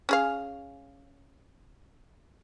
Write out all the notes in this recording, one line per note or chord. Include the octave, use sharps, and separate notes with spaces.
C#4 G#4 F5